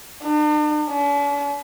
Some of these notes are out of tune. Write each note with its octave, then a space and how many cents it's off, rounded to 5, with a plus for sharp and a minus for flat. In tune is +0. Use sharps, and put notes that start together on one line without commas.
D4 +45
D4 -45